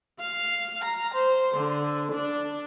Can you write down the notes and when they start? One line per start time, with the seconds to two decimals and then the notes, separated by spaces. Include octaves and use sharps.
0.21 F5
0.83 A#5
1.14 C5
1.55 D3
2.15 D4